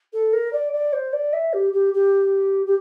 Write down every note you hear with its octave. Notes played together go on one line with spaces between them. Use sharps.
A4
A#4
D5
D5
C5
D5
E5
G4
G4
G4
G4